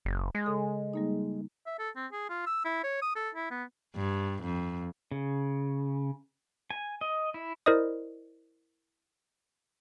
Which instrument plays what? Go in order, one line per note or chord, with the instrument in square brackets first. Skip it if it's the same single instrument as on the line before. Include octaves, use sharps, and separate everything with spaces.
[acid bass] F#1
G#3
[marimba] C#3 A4
G3 A#3 D#4
[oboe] E5
A4
C4
G#4
F4
E6
E4
C#5
D#6
A4
E4
B3
[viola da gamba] G2
F2
[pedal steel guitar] C#3
G#5
D#5
E4
[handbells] E4 A#4 C5 D5 D#5 D#6